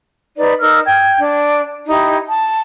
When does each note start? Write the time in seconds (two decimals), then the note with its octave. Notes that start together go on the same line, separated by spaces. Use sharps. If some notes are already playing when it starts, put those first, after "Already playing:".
0.38 D#4 B4 D5
0.61 D#4 A#4 E6 F6
0.87 G5 G#6
1.20 D4
1.87 D#4 E4 G4
2.29 A5